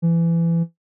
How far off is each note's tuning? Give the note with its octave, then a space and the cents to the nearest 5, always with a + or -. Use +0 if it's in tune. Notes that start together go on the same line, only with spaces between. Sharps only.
E3 +25